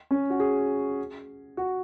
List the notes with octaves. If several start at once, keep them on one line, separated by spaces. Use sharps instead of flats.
C#4
F#4
G#4
F#4